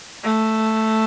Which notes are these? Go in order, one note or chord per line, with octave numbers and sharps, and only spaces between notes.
A3